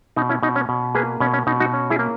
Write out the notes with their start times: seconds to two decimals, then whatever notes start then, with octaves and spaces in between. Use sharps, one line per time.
0.16 B2 D#4
0.29 C#4 E4
0.43 B2 D#4
0.56 C#4
0.69 B2
0.95 A#3 G#4 B4
1.20 B2 C#4
1.34 C#4
1.47 B2 D#4
1.60 D#4 F#4
1.74 C#4
1.90 E4 G#4
1.99 A#3